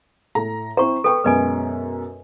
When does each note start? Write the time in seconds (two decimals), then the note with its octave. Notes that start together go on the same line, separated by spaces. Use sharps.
0.35 A2 A4 A#5
0.77 C4 E4 C5 A#5 C#6
1.04 A4 B4 G5 C#6
1.24 F#2 B2 G#3 B4 D#5 G#5